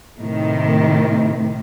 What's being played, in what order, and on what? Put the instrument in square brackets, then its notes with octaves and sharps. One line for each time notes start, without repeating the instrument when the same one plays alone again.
[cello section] A2 C3 D#3